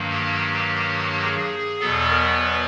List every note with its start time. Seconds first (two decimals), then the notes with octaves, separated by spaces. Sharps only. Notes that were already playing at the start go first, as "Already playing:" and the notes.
Already playing: G2 D#3 F#3 A#3
0.10 G4
1.23 G#4
1.80 E2 B2 F#3 B3 A4
2.08 A#4
2.37 B4